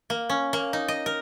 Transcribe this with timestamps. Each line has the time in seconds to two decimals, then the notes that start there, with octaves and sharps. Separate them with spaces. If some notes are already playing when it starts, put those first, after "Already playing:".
0.10 A#3
0.29 C#4
0.53 A#3
0.73 D#4
0.88 D#5
1.06 A#4